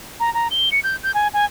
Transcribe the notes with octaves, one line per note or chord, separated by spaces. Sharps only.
A#5
A#5
G7
C#7
G6
G6
G#5
G#5